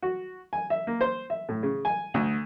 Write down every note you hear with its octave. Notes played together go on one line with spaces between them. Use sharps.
F#4
G#5
E5
A#3
C5
E5
A2
C#3
G#5
D2